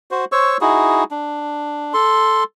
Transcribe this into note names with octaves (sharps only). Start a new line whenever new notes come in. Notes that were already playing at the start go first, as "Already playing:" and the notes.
F#4 C5
C5 C#5 C#6 E6
D#4 E4 F#4 G#4
D4
A4 C6